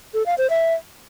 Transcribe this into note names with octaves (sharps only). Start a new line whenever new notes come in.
A4
F5
C5
E5